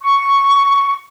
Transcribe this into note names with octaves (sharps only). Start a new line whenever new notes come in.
C#6